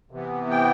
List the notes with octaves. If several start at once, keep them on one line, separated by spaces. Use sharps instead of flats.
C3 E3 B3
G5